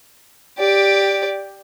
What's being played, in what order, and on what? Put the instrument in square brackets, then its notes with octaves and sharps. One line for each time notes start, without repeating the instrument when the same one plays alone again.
[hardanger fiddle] G4 D5